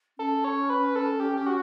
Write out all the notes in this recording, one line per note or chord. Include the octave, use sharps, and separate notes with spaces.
C#4 A4
C#5
B4
A4
G4
G4
F#4